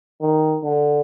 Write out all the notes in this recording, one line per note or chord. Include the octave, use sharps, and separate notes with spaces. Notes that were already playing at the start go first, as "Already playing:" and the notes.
D#3
D3